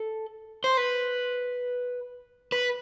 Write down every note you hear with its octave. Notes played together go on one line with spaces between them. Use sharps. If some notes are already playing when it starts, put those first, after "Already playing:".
Already playing: A4
C5
B4
B4